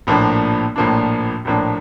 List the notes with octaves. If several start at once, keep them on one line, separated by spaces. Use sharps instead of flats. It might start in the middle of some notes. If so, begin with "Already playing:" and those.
A#1 A2 F3 A#3 D4
A#1 A2 F3 A#3 D4
A#1 A2 F3 A#3 D4